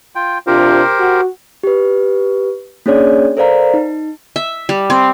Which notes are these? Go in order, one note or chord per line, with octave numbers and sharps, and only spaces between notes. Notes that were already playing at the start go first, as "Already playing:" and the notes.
F4 G5
C3 D4 F4 G4 A#4 C5
F#4
G4 B4
A#3 C#4 D4 G#4 C#5 D5
A4 A#4 C5 D5 F5 A#5
D#4
E5
G3
C4